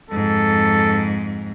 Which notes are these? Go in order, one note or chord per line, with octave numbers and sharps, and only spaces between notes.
F2 G#2 A4